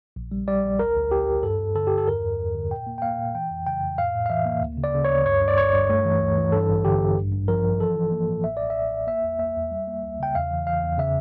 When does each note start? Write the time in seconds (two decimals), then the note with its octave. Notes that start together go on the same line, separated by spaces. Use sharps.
0.16 A#1
0.32 G3
0.48 G3 D5
0.64 A#1
0.79 D2 A#4
0.96 D2
1.11 D2 G4
1.28 D2
1.43 G2 A4
1.59 G2
1.75 D3 A4
1.87 G2 G4
1.98 A4
2.08 E2 A#4
2.22 E2
2.39 E2
2.55 D3
2.71 A#2 G5
2.87 A#3
2.98 G5
3.02 A#3 F5
3.18 A#2
3.34 E3 G5
3.51 F2
3.66 C#3 G5
3.82 F2
3.98 A2 F5
4.14 A2
4.26 F5
4.30 E3 E5
4.46 A#3
4.62 D2
4.78 C#3
4.84 D5
4.94 C#3
5.04 C#5
5.10 D2
5.25 G2 C#5
5.41 G2
5.48 D5
5.57 G1 C#5
5.73 G2
5.89 A3
6.05 E3
6.21 D2
6.37 E3
6.52 G2 A4
6.69 A1
6.85 D3 G4
7.01 A1
7.17 G2
7.33 G2
7.48 F3 A#4
7.64 F3
7.80 E3 A4
7.96 E3
8.12 A#3
8.28 A2
8.43 A1 E5
8.57 A1 D5
8.70 E5
8.75 A1
8.92 A1
9.07 A#3 E5
9.23 E2
9.39 A#3 E5
9.56 E2
9.71 G3
9.87 A#3
10.03 C#2
10.20 C#3 G5
10.35 E2 F5
10.51 E3
10.66 E3 F5
10.82 E2
10.98 C#3 E5